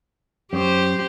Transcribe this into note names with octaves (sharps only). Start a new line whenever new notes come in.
F#2 G4 C5